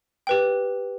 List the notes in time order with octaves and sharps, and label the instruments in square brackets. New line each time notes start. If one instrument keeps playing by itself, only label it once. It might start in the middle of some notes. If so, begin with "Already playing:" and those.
[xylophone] G4 B4 G5